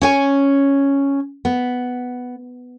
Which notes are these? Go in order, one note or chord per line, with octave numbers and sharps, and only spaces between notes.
C#4 C#5 G#5
B3